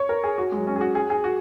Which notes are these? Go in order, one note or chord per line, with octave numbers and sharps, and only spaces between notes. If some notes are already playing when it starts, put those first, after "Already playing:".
Already playing: C#5
A#4
G#4
F#4
G#3
F#3
C#4
G#4
F#4
G#4
G#4
F#4